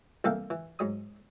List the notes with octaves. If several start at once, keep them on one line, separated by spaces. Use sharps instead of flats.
C2 E3 A#3 A4 F5 G5
E3
G#2 F#3 D#6